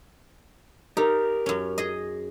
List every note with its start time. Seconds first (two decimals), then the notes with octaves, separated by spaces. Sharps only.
0.97 D#4 G4 A#4
1.46 F#2 C#4
1.78 G#4 D#5